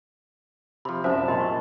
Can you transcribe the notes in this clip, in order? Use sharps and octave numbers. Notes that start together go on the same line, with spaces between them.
C3 F3 B5
C2 F#2 C5 E5 A5
A#2 D#5 B5
C#6